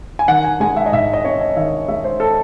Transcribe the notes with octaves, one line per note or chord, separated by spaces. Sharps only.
G#5
D#3 F#5
G#5
G#3 G#5
E5
D#5
G#2 E5
D#5
C4 C#5
D#5
D#3 E5
G#3 E5
C5
A4